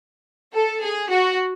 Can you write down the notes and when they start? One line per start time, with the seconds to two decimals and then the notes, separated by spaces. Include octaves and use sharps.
0.55 A4
0.83 G#4
1.11 F#4